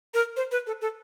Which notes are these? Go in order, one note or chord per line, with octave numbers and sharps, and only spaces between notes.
A#4
C5
B4
A4
A4